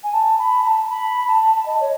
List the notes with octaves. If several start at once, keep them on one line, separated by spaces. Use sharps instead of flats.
G#5
A5
B5
B5
A5
B5
A5
D#5
C#5